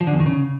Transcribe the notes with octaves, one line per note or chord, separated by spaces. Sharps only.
F3
D3
E2
D#3
C#3